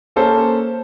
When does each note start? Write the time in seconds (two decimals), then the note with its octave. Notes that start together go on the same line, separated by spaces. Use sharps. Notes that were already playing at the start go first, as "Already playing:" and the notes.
0.16 A#3 C#4 A4 C5